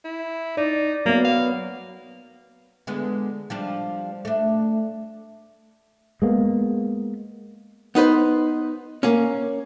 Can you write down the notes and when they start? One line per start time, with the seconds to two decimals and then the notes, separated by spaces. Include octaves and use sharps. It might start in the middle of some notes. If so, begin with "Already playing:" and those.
0.04 E4
0.57 D#4 D5
1.06 F#3 A#3 B3
1.25 F5
2.87 D3 G#3 B3
3.50 F3 G3 D4
4.25 A3 D4
6.22 G#3 A#3 B3
7.95 B3 D#4 B4 C5
9.03 A#3 C#4